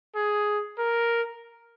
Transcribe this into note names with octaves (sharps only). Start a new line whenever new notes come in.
G#4
A#4